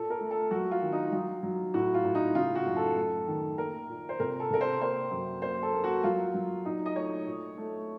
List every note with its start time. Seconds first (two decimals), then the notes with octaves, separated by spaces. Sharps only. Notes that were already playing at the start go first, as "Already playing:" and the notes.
Already playing: A#2 A4
0.10 A#4
0.21 A3
0.31 A4
0.51 F#3 F#4
0.71 F4
0.82 D#3
0.92 D#4
1.12 F#3 F4
1.43 F#3
1.74 A2 F#4
1.94 F4
2.04 A2
2.15 D#4
2.35 C#3 F4
2.55 F#4
2.66 F#2
2.76 A4
2.97 A3
3.27 D#3
3.58 A#3 A#4
3.89 A#2
4.09 C5
4.20 C3 A#4
4.40 A4
4.51 C3 A#4
4.61 C5
4.81 A#3 C5
5.11 F#2
5.42 A#3 C5
5.63 A4
5.73 A#3
5.84 F#4
6.04 F#3 F4
6.34 F#3
6.65 A#2 D#4
6.86 D#5
6.96 A3 C#5
7.26 A#2
7.58 A3